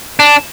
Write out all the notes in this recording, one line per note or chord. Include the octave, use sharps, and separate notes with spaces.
D4